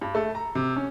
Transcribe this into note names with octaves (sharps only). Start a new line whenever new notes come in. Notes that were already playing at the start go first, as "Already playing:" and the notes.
G2
A3
A#5
C3
C#4